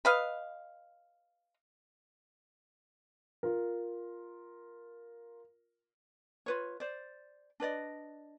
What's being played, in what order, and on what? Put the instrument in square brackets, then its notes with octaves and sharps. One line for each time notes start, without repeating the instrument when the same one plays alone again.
[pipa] B4 D#5 F5
[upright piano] F4 A#4
[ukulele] F4 B4 C#5
C5 D5
D4 B4 D5 D#5